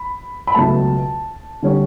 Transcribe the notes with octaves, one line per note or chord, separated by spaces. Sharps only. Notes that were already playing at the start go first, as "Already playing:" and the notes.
Already playing: B5
B5
C#2 B2 F#3 A3 A5
D3 G3 C#4